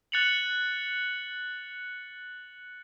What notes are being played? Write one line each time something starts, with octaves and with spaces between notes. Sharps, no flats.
F#6 A6 C#7 F7 F#7